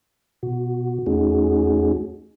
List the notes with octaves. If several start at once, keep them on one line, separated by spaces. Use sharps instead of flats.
B2 F#4
E2 A3 C#4 D#4 F#4 G#4